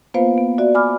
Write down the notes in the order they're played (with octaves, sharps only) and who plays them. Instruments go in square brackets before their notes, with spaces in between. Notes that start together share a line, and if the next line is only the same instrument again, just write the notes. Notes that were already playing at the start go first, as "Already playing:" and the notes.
[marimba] A#3 B3 F4 B4 C5 F5
B3
F#4 D5 E5
G#5 B5 D6 F6